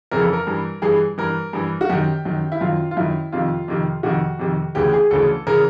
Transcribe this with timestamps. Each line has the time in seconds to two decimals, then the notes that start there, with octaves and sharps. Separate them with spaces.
0.11 F2 C#3 E3 A#4
0.22 A4
0.33 A#4
0.47 G2 E3
0.82 G2 E3 G#4
1.18 G2 E3 A#4
1.53 G2 E3
1.81 F#4
1.89 F#2 D#3 G4
2.25 F#2 D#3
2.52 E4
2.61 F#2 D#3 F4
2.91 F4
2.97 F#2 D#3 E4
3.32 F2 C3 D#3 F4
3.68 F2 C3 D#3
4.03 F2 C3 D#3 F#4
4.39 F2 C3 D#3
4.75 D2 C#3 E3 G4
4.93 G#4
5.11 D2 C#3 E3 A4
5.47 C#3 E3 A#4